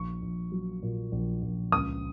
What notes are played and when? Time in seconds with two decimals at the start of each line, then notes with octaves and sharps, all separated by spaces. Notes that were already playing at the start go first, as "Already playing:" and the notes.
Already playing: A#1 C#6
0.22 A#1
0.52 F#3
0.82 A#2
1.12 A#1
1.42 A#1
1.72 C#2 D#6